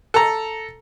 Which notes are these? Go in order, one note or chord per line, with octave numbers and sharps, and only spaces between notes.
A4 A#5